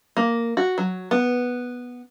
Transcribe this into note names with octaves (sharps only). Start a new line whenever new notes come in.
A#3
F#4
F#3
B3